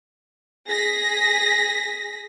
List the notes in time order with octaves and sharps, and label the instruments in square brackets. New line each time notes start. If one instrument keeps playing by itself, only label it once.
[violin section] G#4 A#6 B6